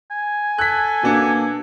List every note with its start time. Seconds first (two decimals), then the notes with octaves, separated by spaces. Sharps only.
0.11 G#5
0.58 A4 F#6 B6
1.03 B2 A#3 D4 C#7